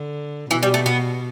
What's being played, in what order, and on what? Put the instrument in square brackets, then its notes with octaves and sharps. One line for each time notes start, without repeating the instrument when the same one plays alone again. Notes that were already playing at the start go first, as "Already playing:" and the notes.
Already playing: [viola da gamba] D3
[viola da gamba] B2 [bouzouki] E3
[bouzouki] G3
A3
B3